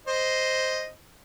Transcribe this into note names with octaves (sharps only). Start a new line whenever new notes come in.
C5 D#5